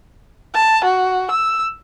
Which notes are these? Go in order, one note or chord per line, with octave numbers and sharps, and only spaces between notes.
A5
F#4
E6